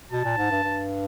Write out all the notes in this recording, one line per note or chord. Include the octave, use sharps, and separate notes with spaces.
B2 A5
A#2
G#2
G2
G2